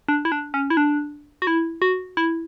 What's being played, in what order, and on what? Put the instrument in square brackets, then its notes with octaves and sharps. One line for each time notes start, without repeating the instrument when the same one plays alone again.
[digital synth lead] D4
E4
D4
C#4
E4
D4
F#4
E4
F#4
E4